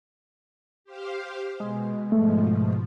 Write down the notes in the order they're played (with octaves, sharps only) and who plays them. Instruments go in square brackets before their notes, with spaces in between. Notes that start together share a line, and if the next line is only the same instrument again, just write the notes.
[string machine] G4 C5 F5
[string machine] B2 [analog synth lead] G#3
[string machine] G#2 B2 F3 [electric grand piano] A3